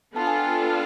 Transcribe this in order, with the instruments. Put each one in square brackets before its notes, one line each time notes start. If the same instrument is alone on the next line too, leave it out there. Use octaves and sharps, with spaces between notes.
[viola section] B3 D4 F4 A4 [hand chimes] A5
[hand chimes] G#5
G5 A5